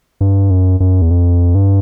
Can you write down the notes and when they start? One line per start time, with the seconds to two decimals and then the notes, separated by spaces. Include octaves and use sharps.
0.21 G2
0.51 F#2
0.80 F#2
1.02 E2
1.10 F2
1.55 G2